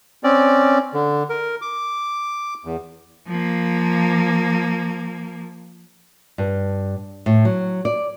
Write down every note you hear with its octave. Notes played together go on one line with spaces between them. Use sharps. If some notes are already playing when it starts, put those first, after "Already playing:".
C4 C#4 D5
D3
A#4
D6
E2
F3 A#3
G2
A2
F#3
D5